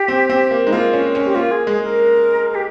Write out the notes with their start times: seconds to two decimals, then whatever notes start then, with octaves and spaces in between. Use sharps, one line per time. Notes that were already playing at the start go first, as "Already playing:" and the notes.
Already playing: G4
0.08 C4
0.29 C4
0.51 A#3
0.66 G#3 D#4
0.72 A#3 F4
0.93 C#4
1.15 C#4
1.26 G4
1.35 A#3 F4
1.51 G#4
1.67 G#3 G#4
1.83 A#4
2.55 G4